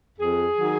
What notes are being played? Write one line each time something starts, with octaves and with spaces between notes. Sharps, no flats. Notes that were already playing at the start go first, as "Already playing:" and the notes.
F2 G#4
D#3 F#3